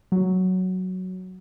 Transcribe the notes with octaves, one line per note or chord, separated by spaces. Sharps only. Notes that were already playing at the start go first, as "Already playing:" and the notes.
F#3